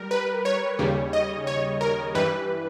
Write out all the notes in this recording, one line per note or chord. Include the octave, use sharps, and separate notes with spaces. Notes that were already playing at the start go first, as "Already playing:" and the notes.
Already playing: G3 A#4
B4
C#5
D#2 C#3 G3
D#5
C#5
A#4
G2 E3 G3 B4